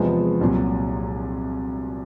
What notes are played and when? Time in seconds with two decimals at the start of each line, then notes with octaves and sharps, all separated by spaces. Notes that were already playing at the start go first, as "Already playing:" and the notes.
Already playing: E2 C3 F3 G#3 B3
0.41 C2 A#2 F#3